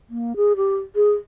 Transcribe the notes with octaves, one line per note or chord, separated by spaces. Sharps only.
A#3
G#4
G4
G#4